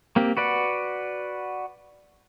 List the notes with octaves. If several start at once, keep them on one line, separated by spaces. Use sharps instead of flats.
A#3 C4 G4
F#4 B4 D5 F#5